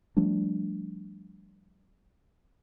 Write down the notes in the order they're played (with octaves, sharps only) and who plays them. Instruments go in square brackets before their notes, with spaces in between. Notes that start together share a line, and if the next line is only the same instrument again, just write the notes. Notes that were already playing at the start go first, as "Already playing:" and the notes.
[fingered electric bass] F3 G3 A3 D4